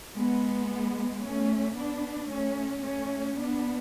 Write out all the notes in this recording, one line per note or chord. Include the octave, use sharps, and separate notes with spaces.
G#3 B3
A3 C#4
B3 D4
A3 C#4
A3 C#4
B3 D4